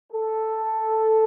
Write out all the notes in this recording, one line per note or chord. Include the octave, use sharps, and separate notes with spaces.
A4